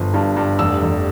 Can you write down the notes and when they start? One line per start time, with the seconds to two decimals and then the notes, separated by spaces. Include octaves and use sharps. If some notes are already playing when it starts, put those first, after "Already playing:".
Already playing: G1 F3
0.14 G2
0.37 G2
0.59 F1 E6
0.83 F1